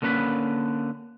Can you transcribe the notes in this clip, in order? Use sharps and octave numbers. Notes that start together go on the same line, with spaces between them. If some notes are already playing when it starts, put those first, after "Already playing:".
D3 A#3 C#4 B4 A#5 B5